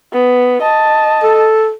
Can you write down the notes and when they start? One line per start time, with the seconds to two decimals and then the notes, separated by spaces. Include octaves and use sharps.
0.13 B3
0.62 D#5 A5
1.23 A4